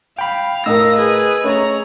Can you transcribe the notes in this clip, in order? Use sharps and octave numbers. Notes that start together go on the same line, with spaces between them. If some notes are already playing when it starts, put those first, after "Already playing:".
F5 G5 B5
A2 A#4 D#5 F5 E6 A#6
G#4 B4
A3 C#4 G#4 C#5 A#5